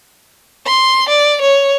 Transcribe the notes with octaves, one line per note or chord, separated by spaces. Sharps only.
C6
D5
C#5